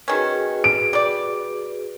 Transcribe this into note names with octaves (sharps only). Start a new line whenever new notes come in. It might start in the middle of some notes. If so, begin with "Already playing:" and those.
D#3 C#4 F#4 G#4 B4
D7
G3 D5